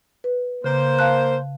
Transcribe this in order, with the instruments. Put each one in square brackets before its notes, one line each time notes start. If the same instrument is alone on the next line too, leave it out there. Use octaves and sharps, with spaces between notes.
[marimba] B4
[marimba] C#3 [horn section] A#3 C5
[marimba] F5 A5 F#6